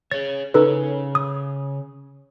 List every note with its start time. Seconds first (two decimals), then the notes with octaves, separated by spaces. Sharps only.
0.11 G#4 C#5 A6
0.54 C#3 C#4 D#4 A4 B4
1.15 D#6